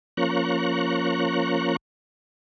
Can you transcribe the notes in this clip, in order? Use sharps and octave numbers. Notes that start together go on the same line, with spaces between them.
F3 A#3 C#4 A#5 C#6 F#6